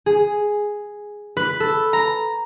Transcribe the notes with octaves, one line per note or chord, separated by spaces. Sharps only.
G#4
B4
A4
A#5